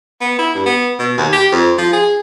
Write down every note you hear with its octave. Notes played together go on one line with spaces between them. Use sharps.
B3
E4
G2
B3
B2
D#2
G4
F2
F3
G#4